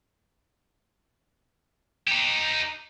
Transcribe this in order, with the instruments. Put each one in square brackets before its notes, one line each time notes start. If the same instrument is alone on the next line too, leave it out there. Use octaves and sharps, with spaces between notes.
[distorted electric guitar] D#4 G4